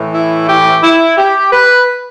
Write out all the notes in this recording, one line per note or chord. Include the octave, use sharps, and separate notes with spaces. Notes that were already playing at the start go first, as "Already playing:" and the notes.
Already playing: A2 E3
E4
G4
E4
G4
B4